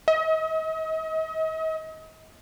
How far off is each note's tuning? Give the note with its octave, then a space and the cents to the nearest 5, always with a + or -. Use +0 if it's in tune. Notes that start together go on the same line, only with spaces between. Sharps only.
D#5 +40